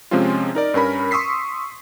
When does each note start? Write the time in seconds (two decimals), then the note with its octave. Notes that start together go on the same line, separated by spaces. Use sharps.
0.11 C3 F3 G#3 C4 C#4 F4
0.55 D#4 A#4 D5
0.74 G2 C#4 A#4 B5
1.11 C6 C#6 D#6 E6 B6 C7